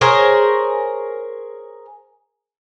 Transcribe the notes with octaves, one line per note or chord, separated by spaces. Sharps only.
G#4 A#4 C5 C#5